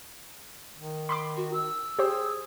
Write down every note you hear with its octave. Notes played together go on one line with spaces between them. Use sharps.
D#3
B5 C6 D6
F#4
E6
G4 G#4 C5